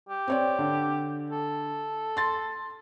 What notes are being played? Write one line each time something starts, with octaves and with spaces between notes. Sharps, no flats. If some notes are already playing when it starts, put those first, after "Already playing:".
G4
C4 C#5 D5
D3
A4
C6 A6